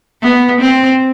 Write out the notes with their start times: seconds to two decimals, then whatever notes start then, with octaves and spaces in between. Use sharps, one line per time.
0.22 B3
0.61 C4